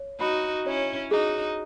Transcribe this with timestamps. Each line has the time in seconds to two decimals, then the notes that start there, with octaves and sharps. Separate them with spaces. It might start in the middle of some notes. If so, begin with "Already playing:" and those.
Already playing: C#5
0.20 D#4 F#4 B5
0.66 C#4 E4 C#5
1.11 D#4 F#4 G#4